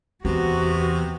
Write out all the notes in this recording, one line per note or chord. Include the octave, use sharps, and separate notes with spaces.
E2 C3 B3 F#4